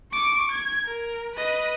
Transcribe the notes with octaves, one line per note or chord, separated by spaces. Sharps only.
C#6 D6
G#6
A#4
B4 D#5